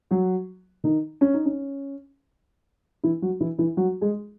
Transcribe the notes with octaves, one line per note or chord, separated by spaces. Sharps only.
F#3 F#4
D#3 D#4
C#4
D#4
C#4
E3 E4
F#3 F#4
E3 E4
E3 E4
F#3 F#4
G#3 G#4